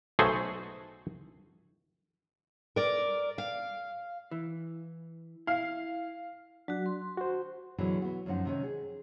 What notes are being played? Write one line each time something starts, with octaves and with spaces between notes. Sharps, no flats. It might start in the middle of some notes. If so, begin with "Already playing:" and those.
B1 A3 F#4 G#4 C5
A#4 D5
F5
E3
E4 F5
F#3 D4 F#4
C6
F#4 C5
B2 D3 E3 F#3 G#3
B3 F#4
F#2 D3 F3 D#4 F#5
C3 D#3 C#4
G#4